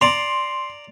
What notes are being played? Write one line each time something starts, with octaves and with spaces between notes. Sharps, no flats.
D5 A#5 C6